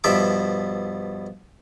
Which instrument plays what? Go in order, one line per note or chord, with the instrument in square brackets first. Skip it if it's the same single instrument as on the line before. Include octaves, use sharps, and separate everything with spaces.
[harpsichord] G2 B2 F3 E5 D6